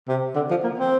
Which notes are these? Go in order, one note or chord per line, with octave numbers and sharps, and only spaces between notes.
C3
D3
F3
A#3
C4